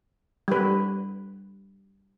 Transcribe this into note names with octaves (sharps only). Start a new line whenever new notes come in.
G3 B4